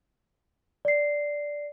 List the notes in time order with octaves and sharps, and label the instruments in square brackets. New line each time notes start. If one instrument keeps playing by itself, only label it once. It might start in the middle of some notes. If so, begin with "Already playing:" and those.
[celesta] D5 C7